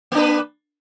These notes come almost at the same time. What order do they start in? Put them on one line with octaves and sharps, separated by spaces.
A#3 D4 B4